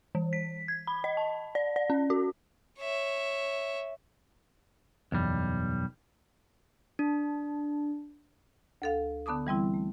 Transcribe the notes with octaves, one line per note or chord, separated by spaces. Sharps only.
E3
B6
G#6
B5
D#5
A5
D5
D5
C#4
F#4
C#5 E5
F#1 B1 E2 G3
D4
D2 A4 F5
D3 B3 A5 D6 D#6
E3 G3 C4 E4
A3